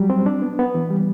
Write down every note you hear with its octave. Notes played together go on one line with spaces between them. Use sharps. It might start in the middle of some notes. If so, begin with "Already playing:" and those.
Already playing: F#3 G3
C4
D4
B3
B3
E3
G3